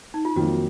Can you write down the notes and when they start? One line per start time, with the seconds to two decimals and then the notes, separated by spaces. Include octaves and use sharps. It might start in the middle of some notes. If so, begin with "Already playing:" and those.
0.14 D#4
0.25 F4
0.36 F2 D#3 F#3 A#3 F#4